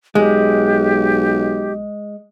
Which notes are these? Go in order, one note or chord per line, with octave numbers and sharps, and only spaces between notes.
B1 G#3 G4